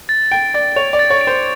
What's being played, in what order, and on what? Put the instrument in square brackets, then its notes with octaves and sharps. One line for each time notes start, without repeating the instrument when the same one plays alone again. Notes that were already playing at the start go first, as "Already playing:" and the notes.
[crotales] A6
[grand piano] G5 [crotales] D7
[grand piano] D5 [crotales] A6
[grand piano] C#5 [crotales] F7
[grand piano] D5
[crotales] A6
[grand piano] C#5
[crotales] D7
[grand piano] C5